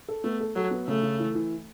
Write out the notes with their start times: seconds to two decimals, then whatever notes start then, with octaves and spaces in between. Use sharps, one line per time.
0.08 A4
0.24 A3 B3
0.40 A4
0.56 F#3 A4
0.71 B3
0.88 C#3 A3
1.03 C#3
1.19 E3
1.35 E3